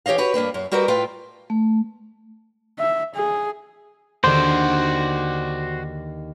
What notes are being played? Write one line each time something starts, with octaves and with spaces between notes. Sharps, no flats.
E3 G4 C#5 D#5 F5
F#4 G4 B4 C#5
G2 A#3 D4 B4
F#2
G3 F#4 G4 A#4 B4 D#5
A2 F4 B4 G5
A3
E5
G#4
D#2 D3 D#3 F#4 C5 D5